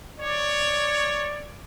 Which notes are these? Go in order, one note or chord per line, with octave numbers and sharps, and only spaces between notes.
C#5 D5